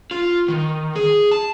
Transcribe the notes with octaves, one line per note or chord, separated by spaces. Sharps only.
F4
D#3
G#4
A5